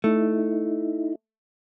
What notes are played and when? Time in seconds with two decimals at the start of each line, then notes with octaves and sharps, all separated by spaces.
0.04 A3 D#4 E4